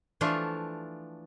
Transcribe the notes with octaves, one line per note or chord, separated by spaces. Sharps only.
E3 F3 A3 D4 F4